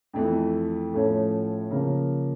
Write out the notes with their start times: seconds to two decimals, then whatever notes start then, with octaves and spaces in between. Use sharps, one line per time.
0.13 F2 E3 A3
0.93 A2 F3 A3 C#4
1.71 C#3 F3 A#3